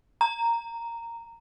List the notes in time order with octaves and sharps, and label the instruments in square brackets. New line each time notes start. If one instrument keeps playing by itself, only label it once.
[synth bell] A#5